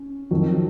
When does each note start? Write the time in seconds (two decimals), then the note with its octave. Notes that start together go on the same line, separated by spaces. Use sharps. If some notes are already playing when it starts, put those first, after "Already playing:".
Already playing: C#4
0.31 F2 D#3 F#3